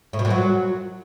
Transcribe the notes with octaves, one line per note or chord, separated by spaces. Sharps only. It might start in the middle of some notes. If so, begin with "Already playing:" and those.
A2
B2
A#2
F#3